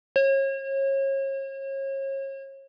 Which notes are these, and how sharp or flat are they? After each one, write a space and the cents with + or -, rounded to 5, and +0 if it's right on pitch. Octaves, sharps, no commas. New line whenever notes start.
C#5 -35